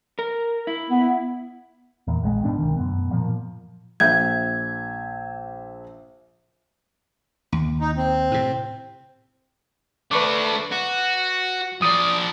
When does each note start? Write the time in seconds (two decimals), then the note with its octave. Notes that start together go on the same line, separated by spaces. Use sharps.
0.19 A#4
0.67 E4
0.90 B3
2.08 E2 A#2
2.23 A#1 G#3
2.43 G#1 G#2 B2 D4
2.58 C2 D#3
2.76 F#2 B2
3.11 A#2 F3 A#3
4.00 A#1 E5 G6 G#6
7.52 D#2
7.80 D#4
7.96 C4
8.31 A2 C3
10.11 A3 D4 B4 C#6 D6
10.72 F#4
11.82 F3 D5 D#6